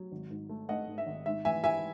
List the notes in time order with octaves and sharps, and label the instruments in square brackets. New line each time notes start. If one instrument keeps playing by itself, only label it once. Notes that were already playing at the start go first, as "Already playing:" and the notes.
Already playing: [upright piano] F#3
G#1
G#2
A3
A3 D#5 F#5
G#2
E5
G#1
G#2 E5
E3 E5 G#5
E4 E5 G#5